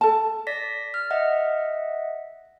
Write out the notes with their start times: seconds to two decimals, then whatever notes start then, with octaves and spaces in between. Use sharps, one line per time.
0.01 A4 A5
0.47 D5 A#6 B6
0.94 F6
1.11 D#5 E5 F#5